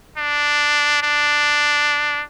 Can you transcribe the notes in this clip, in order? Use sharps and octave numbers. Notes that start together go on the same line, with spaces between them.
D4
D4